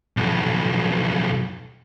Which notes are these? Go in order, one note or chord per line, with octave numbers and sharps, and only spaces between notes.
B1 F2